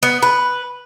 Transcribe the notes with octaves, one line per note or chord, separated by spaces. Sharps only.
B3
B4